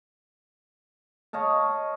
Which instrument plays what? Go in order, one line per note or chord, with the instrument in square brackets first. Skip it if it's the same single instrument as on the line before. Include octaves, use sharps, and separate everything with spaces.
[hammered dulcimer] C#5 D#5 F5 A5